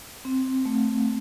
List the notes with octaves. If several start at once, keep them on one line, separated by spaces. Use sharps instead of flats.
C4
A3